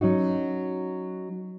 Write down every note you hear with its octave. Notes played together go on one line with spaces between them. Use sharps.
F#3 C#4 D#4 F#4